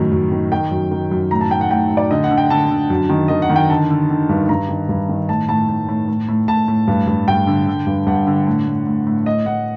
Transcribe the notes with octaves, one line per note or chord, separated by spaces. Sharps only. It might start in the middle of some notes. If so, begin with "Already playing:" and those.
Already playing: F#2 A2 D#3
F#2
D#3
D#3 G5
F#2
D#3
F#2
A2 A#5
A5
A2 G5
F#5
A2 G5
A2
D5
D3 D#5
F#5
D3
G5
D3 A5
D3
F#2
D#3
D#3 D#5
F#5
D#3
G5
D3 A5
D3
D3
G2
G2 A#5
D#3
G2
D#3
A2 A5
A2 A5
A2
A2
A2
A2
A2 A5
A2
G2
G2
G2 G5
D3
D3
G2
G2 F#5
D3
A2
A2
A2
A2
A2 D#5
A2 F#5